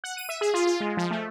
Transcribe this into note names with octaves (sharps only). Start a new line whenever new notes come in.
F#5
D#7
E5
G#4
F4
F4
G#3
F3
A3